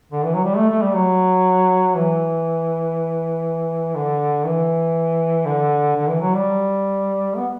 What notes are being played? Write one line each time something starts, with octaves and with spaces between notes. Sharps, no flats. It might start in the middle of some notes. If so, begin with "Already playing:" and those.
D3
E3
F#3
G3
A3
A3
G3
F#3
E3
D3
E3
D3
D3
E3
F#3
G3
B3